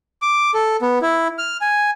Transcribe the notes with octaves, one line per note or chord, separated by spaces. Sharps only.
D6
A4
B3
E4
F6
G#5